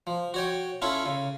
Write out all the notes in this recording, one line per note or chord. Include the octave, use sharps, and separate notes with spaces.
F3
F#4 C#5 G5
C#4 E4 F4 A4
C#3